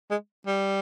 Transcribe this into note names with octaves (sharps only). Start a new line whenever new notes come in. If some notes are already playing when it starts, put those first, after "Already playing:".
G#3
G3